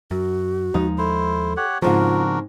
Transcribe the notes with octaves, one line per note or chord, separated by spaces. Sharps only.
F#2 F#4
D#2 F3 G#3 D#4
E4 A4 C5
G4 C#5 F#5
G#2 C#3 F3 C4 D4 F4 F#4 A#4